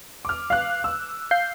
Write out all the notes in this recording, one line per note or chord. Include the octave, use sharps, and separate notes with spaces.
D6 F6
F5 F#6
E6
F5 G6 C7